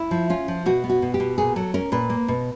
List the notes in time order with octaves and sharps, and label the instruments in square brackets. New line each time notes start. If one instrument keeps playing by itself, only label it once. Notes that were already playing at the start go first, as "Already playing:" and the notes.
Already playing: [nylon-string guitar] E4
F3
C#4 F4
F3
B2 F#4
B3
F#4
B2
G4
B2
A#2 G#4
F#3 A4
C#4 A#4
A#2 B4
A#3
B2